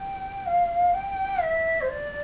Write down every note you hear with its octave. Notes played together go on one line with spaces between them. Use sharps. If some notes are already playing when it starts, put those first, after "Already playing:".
Already playing: G5
F5
G5
E5
C5
D5